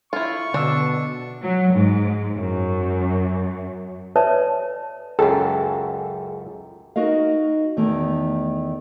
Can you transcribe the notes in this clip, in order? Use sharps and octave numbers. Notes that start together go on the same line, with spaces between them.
E4 F4 A4 C#6
B2 D3 D4 E6
F#3
G#2
F#2
A4 B4 C#5 D5 E5 A5
C#2 F#2 G#4 A4 G5
D#4 F#4 A#4 D#5 F5
E2 D#3 A3